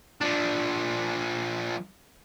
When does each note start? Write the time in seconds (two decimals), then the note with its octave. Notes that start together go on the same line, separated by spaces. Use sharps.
0.21 F3 D4